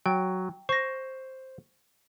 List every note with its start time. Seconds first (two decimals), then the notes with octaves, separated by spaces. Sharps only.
0.06 F#3 G5
0.69 C5 C#6 A#6